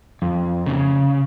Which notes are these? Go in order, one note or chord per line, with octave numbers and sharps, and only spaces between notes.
F2
C#3